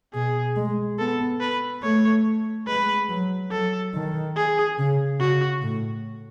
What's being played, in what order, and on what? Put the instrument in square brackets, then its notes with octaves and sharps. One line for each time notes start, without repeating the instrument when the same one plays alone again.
[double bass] B2 [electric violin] G#4
[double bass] G#3
[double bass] B3 [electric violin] A4
[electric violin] B4
[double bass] A3 [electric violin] C#5
[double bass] G#3 [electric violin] B4
[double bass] F#3
[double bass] F#3 [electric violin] A4
[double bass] D#3
[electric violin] G#4
[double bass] C#3
[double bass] C#3 [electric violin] F#4
[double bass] A2